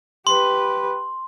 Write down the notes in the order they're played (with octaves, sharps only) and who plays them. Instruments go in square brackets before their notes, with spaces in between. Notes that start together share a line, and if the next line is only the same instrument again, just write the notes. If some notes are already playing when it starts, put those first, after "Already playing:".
[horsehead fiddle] G4 B4 [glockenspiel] C6